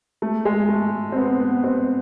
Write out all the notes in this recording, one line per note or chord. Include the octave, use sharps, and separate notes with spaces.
A3
G#3
A3
C4
B3
B3
C4